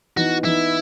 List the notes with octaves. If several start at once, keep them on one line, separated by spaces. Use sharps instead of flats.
E3 B3 D#4 F#4
E3 B3 D#4 E4